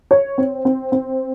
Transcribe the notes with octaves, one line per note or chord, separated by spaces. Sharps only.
C#5
C4
C4
C4